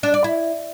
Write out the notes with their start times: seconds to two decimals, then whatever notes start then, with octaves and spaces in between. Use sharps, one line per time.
0.03 D4
0.14 D5
0.24 E4